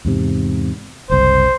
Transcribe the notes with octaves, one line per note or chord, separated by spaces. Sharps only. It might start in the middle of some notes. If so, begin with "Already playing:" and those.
E2 G#2 C3
F#1 C2 C5